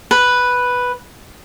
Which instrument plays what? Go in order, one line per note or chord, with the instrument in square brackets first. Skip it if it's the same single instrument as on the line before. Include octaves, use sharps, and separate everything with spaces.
[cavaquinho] B4